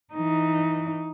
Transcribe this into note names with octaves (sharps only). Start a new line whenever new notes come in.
E3 D#4